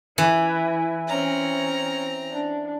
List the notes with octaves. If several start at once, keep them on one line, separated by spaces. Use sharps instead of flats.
E3 E4
C4 C#4 A#5
D4